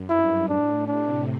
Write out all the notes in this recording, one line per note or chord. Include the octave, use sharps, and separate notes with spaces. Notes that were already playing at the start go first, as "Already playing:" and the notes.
Already playing: F#2
G2 E4
A2 D4
C3 D4